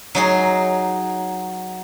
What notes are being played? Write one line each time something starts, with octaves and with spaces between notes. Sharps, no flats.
F#3 D#4 G#4